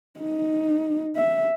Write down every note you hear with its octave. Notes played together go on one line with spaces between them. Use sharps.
D#4
E5